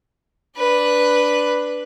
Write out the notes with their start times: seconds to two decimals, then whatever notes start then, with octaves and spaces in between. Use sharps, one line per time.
0.57 D4 B4